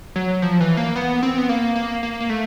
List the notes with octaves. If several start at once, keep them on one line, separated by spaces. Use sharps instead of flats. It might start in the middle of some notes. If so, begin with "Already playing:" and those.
F#3
F3
E3
A#3
B3
C4
B3
A#3
A#3
A#3
A#3
A3